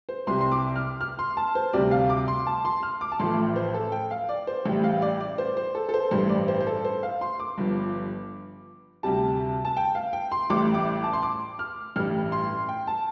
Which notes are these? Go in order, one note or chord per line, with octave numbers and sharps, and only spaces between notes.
C5
C2 C3 G3 C6
C6
D6
F6
F6
C6
A5
C5
D2 C3 G3 D5
F5
D6
C6
A5
C6
F6
D6
A5
A1 A2 F3 A3 C6
C5
A4
G5
F5
D5
C5
A1 A2 G3
F5
D5
D5
C5
C5
A4
A4
C5
A1 G2 G3 C5
D5
C5
C5
A4
C5
F5
C6
D6
G1 G2 F3
D2 C3 G3 A5
A5
G5
F5
G5
C6
A1 A2 G3 D6
D6
A5
C6
D6
F6
A1 G2 G3 F6
C6
G5
A5